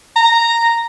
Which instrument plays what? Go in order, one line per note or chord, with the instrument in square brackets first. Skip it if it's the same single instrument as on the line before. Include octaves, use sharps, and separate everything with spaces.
[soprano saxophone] A#5